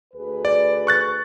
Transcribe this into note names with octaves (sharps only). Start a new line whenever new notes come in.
D2 G#4 B4
D5
C#6 F#6 A6